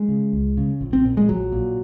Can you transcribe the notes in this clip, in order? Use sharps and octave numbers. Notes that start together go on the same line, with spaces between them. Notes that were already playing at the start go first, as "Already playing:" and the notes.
Already playing: G#3
C#3
C#2
C#3
A#1
C4
A#2
G#3
A#1 F#3
A#2